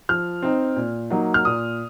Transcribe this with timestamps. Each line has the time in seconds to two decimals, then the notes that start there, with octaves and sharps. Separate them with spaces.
0.09 F3 F6
0.43 C4 D#4
0.76 A#2
1.10 F#3 A#3 D#4
1.34 F6
1.45 A#2 D#6